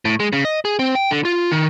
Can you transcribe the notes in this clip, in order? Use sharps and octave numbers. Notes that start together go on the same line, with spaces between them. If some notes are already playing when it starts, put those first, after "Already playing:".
A2
G#3
C#3
D#5
G#4
C4
G5
D3
F4
D#3